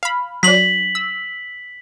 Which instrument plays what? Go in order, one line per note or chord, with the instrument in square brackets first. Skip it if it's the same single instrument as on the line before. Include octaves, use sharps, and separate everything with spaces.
[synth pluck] F5 B5
[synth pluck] F#3 D4 [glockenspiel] B6 F#7
[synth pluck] E6